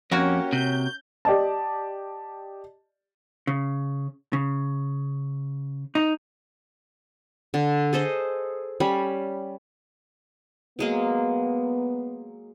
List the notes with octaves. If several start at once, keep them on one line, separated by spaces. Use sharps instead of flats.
F2 A#3 C#4 F#4 G4 C#5
C3 G6
G4 D5 D#5 A5
C#3
C#3
D#4
D3
G#4 A4 C5 D#5
G3 C#4 B5
F#3 G#3 A#3 B3